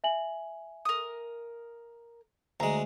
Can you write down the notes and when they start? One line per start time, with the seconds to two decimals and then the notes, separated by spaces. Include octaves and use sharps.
0.04 E5 G#5 F#7
0.85 A#4 D#6
2.60 D2 G#3 A#5